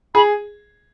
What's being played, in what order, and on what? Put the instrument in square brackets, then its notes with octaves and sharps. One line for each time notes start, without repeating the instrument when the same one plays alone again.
[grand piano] G#4 [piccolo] B5